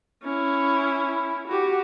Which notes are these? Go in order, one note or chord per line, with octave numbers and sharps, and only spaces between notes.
C#4 E4
F#4 G4